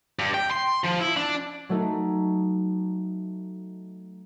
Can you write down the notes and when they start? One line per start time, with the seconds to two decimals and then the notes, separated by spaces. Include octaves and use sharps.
0.19 G2
0.34 G5
0.51 C6
0.85 F3
1.01 E4
1.18 D4
1.69 F#3 A3 D#4